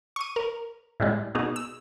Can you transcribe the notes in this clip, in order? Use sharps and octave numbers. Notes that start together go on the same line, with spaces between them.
C#6 D#7
A#4
A2 G3 G#3
B2 D#4 G#4
E6